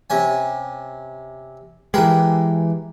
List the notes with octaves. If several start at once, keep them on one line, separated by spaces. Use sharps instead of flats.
C3 C#4 G#5
E3 G#3 G4 A#4 B4